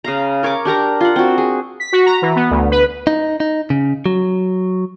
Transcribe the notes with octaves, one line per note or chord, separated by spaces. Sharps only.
C#3 F5 A#5
A#4 C#5 C#6 D6
D4 G4 A#4 A#5
F4 F#5
C4 F#4
G#4
B6
F#4
A#5
E3
B3
D2
B4
D#4
D#4
C#3
F#3